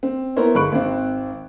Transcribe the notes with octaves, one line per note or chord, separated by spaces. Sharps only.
C4
B3 E4 A#4 C5 C#5
G1 G#3 B5 C#6 F#6 D7
G#1 C4